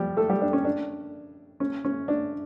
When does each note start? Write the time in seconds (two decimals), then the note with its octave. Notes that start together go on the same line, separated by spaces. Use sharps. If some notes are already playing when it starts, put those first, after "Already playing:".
Already playing: F3 G3 G4
0.17 A3 A4
0.29 G3 G4
0.41 D4
0.53 C#4
0.65 D4
1.60 C#4
1.85 C#4
2.08 D4